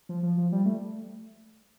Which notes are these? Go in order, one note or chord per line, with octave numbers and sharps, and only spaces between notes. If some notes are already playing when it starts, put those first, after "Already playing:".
F3
F3
F3
G3
A3